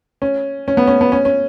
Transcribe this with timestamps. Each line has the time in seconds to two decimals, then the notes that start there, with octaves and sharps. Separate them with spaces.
0.22 C#4
0.68 C#4
0.77 B3
0.87 C#4
1.01 B3
1.12 C#4
1.25 C#4